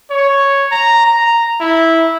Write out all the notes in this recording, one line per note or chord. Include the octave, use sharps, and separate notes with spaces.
C#5
A#5
A#5
E4